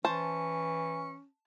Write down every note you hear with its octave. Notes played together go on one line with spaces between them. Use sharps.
E3 C#4 C5 A5